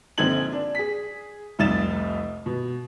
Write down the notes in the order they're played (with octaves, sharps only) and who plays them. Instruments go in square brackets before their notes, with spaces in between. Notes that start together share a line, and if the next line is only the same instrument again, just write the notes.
[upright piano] A#1 D3 C4 D#4 G#6 F#7
D4
G#4 B6
F1 C2 D#4 E5 A6 E7
B2